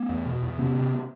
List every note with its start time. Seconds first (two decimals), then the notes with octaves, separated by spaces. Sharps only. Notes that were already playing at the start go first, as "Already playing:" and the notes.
Already playing: A3 B3
0.09 E2
0.26 B2
0.42 E2
0.58 C3 B3 C#4
0.75 C3